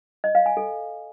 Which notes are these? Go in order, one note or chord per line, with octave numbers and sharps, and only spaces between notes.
D#5
F5
G#5
A4